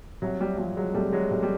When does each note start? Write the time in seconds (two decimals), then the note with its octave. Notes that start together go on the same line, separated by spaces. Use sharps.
0.22 C2 F#3
0.41 G3
0.58 F3 G3
0.77 F#3 G#3
0.94 C2 G3 A3
1.12 F#3 G#3
1.31 C2 G3
1.43 G3